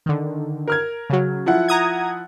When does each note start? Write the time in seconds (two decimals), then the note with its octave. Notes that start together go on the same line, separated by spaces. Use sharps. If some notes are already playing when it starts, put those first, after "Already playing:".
0.06 D3 D#3
0.68 A#4 F6 G#6
1.10 C#3 F#3
1.46 F3 E4 F#5
1.68 A#5 D#6 G#6